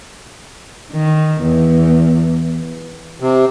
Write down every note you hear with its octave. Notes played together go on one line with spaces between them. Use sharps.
D#3
E2
C3